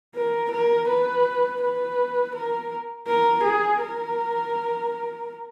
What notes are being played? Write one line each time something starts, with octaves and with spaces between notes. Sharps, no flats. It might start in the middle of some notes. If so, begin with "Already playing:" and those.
A#4
A#4
B4
B4
A#4
A#4
G#4
A#4